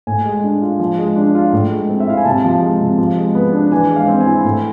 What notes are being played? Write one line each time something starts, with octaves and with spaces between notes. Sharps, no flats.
A2 G#5
G#3
D4
F4
F3
G#3
D4
F4
A2
G#3
C4
E5
E4 F5
G#5
C3 A5
F3
G#3
C3
F3
G#3
B3
D4
E3 G#5
G#3
F5
C4
G#5
E4
A2